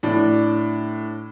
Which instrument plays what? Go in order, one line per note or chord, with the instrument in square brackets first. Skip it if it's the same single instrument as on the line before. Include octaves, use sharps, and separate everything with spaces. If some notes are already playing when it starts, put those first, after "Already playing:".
[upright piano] A2 D4